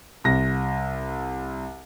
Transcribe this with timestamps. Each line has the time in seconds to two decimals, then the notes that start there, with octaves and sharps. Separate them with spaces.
0.24 C2 A#6